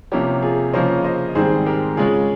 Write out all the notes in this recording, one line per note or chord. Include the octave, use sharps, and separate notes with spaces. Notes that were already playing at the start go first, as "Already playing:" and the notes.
C3 F3 A#3 C#4 G4
F4 G#4
C#3 F3 A#3 C#4 C5 D#5
C5 D#5
G#2 D#3 G3 C4 G#4 C5
G4 A#4
C#3 G#3 C#4 F4 G#4